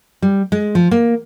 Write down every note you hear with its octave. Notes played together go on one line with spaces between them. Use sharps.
G3
G#3
F3
A#3